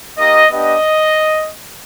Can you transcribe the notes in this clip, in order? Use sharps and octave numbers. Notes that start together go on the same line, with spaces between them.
A#3 D#4 G4 D#5
B3 D4 G4 D#5